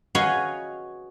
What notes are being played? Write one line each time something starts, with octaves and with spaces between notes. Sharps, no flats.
F#4 G#4 B4 C#5 D#5 F5